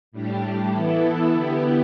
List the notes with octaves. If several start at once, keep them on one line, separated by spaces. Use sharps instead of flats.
A2 G3 D4 G4
E3 B3 E4 A4
D3 B3 E4 G4